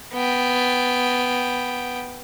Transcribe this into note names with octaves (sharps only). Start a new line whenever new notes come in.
B3 G5